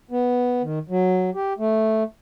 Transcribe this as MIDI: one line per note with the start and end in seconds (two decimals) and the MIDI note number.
0.11 0.62 59
0.62 0.79 51
0.89 1.30 54
1.35 1.53 67
1.59 2.03 57